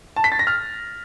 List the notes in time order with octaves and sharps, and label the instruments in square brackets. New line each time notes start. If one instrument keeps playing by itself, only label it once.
[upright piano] A5
B6
A6
A#6
F6